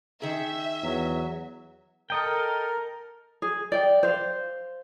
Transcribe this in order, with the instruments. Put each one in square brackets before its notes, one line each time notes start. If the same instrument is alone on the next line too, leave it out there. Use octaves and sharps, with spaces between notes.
[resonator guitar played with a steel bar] D#3 G#4 [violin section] E5
[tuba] E2 [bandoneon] F#3
[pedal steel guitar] A4 D#5 G5 [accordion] A#4
[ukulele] G#4
D5 G5
C5 F5